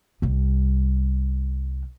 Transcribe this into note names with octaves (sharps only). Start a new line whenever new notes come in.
C2 G3